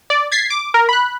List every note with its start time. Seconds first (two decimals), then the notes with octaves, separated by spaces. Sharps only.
0.10 D5
0.32 G#6 A6 B6 C7
0.50 D6
0.74 A#4
0.89 B5 F#6